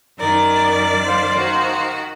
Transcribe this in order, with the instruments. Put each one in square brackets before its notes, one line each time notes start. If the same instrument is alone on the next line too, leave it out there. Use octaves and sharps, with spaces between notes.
[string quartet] F#2 D#3 D5 [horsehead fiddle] D#4 A#4
[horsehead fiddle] C5 F5
[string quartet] D#3 F#4